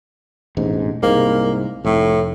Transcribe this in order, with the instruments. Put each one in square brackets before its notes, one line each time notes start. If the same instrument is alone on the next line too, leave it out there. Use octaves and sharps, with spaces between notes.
[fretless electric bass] E1 A1 G#2
[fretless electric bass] C2 G#2 [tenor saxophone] A#3
[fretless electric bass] F1 [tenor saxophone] A2